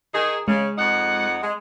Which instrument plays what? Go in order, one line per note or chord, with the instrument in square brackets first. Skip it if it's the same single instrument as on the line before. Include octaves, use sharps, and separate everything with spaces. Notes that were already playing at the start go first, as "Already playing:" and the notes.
[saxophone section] D#3 D#4 G#4
[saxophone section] C#3 [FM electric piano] G#3
[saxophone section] F2 D#4 F#5
G#3